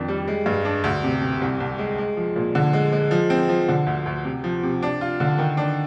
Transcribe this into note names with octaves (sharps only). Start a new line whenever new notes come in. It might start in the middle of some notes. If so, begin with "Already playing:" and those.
Already playing: F2 D#3 D4
G3
G#3
G2
D4
D2
C3
C3
C2
C2
G#3
G#3
F3
A#2
D3
G#3
G#3
F3
C4
F3
D3
D2
D2
C3
F3
C3
D4
F4
D3
D#3
D4